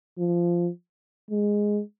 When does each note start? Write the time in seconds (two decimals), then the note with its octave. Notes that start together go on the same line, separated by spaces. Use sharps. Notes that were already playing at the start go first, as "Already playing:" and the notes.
0.18 F3
1.31 G#3